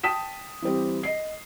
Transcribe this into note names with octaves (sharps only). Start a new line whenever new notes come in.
G5 A5 D#6 B6 E7
E3 G3 C4 G4
D#5 C7